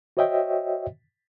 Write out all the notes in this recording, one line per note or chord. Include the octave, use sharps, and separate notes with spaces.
F#4 C5 C#5 D#5 E5 G5